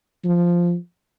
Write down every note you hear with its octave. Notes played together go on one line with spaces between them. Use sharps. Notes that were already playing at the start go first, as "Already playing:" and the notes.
F3